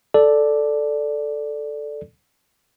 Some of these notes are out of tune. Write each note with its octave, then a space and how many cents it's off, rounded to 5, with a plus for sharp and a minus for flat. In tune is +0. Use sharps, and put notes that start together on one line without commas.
A4 +0 D5 +0